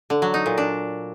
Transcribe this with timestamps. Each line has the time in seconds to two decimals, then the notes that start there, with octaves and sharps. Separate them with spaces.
0.10 D3
0.22 F#3
0.34 D#4
0.46 A#2
0.58 D4